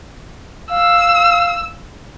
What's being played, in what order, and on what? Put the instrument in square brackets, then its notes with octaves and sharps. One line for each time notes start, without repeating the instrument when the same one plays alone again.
[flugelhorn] F5 [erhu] E6